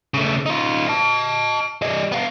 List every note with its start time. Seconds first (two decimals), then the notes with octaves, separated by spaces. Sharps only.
0.14 C#3 A3
0.46 D#4 F4
0.88 D#5 A5
1.82 G3 D#5
2.12 B3 F5